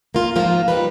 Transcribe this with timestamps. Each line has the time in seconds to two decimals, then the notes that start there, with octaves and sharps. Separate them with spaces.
0.15 A#3 F4
0.35 G#2 F3 A#3 F4 C5
0.68 G3 D#4 B4